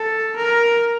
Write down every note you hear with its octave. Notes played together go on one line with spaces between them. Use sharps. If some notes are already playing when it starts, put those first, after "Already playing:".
Already playing: A4
A#4